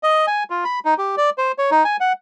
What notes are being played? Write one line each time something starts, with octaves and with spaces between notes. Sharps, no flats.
D#5
G#5
F4
B5
D#4
G4
D5
C5
C#5
D#4
G#5
F#5